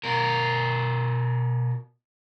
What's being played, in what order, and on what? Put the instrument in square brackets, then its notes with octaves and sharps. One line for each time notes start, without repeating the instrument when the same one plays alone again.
[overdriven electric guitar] B2 A#4